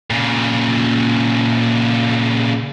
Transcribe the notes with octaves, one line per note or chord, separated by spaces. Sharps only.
A#2 C#3